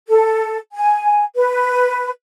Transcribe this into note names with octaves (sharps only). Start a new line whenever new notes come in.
A4
G#5
B4